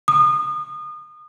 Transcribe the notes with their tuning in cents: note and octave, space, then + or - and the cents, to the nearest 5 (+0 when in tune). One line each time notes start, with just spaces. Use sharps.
D#6 -30